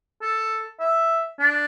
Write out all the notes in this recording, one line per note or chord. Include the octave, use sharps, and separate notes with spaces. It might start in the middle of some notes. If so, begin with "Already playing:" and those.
A4
E5
D4